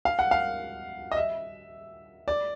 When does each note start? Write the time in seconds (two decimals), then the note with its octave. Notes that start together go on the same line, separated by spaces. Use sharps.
0.05 F5
0.19 F#5
0.31 F5
1.12 D#5
1.17 E5
2.28 D5